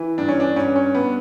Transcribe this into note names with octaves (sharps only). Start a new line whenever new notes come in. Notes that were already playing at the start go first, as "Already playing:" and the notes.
Already playing: E3
G2 D4
C#4
D4
G2 C#4
C#4
G2 B3